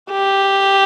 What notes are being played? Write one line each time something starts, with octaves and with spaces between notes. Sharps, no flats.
G4